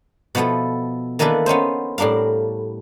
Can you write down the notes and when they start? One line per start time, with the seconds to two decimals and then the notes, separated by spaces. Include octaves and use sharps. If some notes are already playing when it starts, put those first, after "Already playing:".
0.35 B2 F3 B3 E4 A4
1.19 D#3 E3 A#3 D4 A4 B4
1.46 B3 C#4 D#4 C5
1.98 A2 G3 D4 A#4 F5